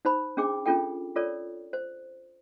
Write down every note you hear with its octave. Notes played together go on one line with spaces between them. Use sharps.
D#4 C5 B5
C#4 D4 G#4 G5 D6
C#4 D4 F4 A4 G5
F4 A4 A#4 C#5 D5
C5